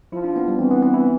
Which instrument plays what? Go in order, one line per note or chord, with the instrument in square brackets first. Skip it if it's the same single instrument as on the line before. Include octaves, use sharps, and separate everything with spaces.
[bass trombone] F3 [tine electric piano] E4
[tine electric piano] D4
B3
G3
[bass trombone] E3 [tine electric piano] C4
[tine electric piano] B3
B3
E4